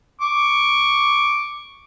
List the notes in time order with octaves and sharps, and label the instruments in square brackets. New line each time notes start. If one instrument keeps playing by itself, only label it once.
[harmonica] C#6 D6